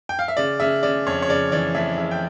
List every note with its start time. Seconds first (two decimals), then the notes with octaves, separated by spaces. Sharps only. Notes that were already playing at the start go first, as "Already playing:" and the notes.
0.09 G5
0.19 F5
0.28 E5
0.37 C#3 D5
0.60 C#3 E5
0.83 C#3 D5
1.06 F2 C#5
1.22 C#5
1.29 C#3 D5
1.52 E3 D5
1.75 F2 E5
1.98 C#3 E5
2.11 G5